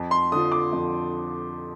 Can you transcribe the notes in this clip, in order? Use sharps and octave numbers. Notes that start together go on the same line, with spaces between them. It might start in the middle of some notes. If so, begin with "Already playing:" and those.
Already playing: F2
C6
D3 F3 D#6
D6
F2